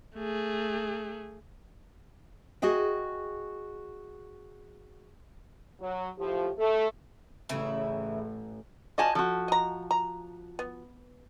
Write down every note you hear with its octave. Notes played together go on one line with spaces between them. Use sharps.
A3 G#4
F#4 G#4 D#5 G5
F#3
A2 F3 G4
A3 A4
A1 C#3 E3 E4
F3 F#4 D5 D#5 G#5 A5
F3 F#4 A4
D#5 A#5
A#5
B3